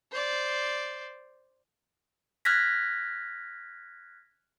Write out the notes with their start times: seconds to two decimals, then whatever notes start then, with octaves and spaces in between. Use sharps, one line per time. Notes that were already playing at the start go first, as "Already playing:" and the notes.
0.11 C5 D5
2.45 F6 F#6 G#6 A#6 B6